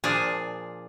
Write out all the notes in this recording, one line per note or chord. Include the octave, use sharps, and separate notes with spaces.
A#2 F3 D4 G#4